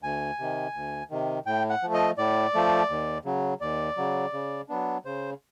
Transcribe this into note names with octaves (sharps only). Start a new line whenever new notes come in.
D2 G#5
C3 D#3
D2
C3 D#3
A2 G5
F#5
F3 A3
D#5
A2 D5
F3 A3
D#2
C#3 F#3
D#2 D5
C#3 F#3
C#3
F#3 B3 D4
C#3 C5